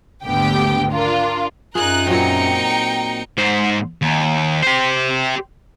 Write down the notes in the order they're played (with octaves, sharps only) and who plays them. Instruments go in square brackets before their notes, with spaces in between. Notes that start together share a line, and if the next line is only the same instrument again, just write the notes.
[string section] G#1 D2 D3 B3 G4 G5
D4 F4 A#4
[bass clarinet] F#2 [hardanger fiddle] D#4 A#4 [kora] F4 G#4 [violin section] F#6
[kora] A#2 F#3 C4 [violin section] G5 A#5 C#7
[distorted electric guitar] G#2 C5
D#2
G4 C5